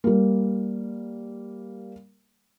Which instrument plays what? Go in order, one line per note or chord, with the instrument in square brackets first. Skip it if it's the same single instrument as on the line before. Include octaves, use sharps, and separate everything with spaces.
[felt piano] G3 A#3